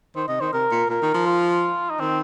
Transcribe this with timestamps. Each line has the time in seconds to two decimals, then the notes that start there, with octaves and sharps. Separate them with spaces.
0.16 D#3 C5
0.28 C3 D#5
0.40 D#3 C5
0.53 C3 A#4
0.71 A#2
0.89 A#2 A#4
1.02 D#3
1.14 F3
1.26 F4
1.90 D#4
2.00 D#3 C4